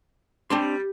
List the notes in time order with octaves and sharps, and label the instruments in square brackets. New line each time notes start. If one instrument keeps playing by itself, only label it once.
[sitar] G3 [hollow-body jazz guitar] C4 D4 C6